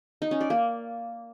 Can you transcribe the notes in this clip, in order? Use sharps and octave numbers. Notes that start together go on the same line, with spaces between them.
D#4
C#4
D5
A#3